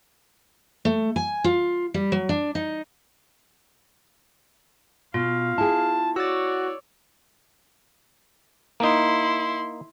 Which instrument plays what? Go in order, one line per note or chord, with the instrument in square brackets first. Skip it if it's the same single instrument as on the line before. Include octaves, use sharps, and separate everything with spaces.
[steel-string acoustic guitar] A3
G#5
F4
G3
F#3
D4
D#4
[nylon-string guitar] B2 [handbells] F4 [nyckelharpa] F5
[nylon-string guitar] E4 G#4 [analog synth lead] A5
[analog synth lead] F#4 [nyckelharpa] C#5 D5 [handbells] E6 A6
[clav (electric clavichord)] A#3 D#4 [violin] E4 C6